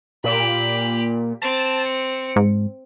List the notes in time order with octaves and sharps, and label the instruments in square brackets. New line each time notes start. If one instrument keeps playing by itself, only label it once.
[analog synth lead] A#2 [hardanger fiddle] G4 B5
[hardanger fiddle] C4 [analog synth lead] A5
[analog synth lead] C#7
[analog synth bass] G#2